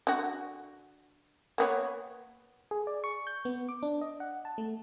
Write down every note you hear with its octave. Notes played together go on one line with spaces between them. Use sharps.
D3 F#4
A#3 B3 C#5
G#4
D5
C#6
G6
B3
D6
D4
D#5
F#5
A5
A3